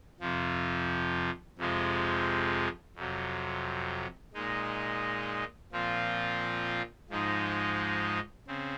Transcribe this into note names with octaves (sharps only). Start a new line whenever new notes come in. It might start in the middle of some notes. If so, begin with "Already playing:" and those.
F2 C3 F3
F2 C3 F3 G#3
F2 C3 F#3
A#2 G#3 D#4
A#2 F3 C4 F4
G#2 F3 G#3 D#4
C#3 C4